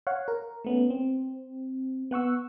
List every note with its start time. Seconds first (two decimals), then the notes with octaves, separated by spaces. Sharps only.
0.07 C#5 F5 F#5
0.28 A#4
0.64 A3 B3 C#4
0.90 C4
2.11 B3 F#5 C#6 E6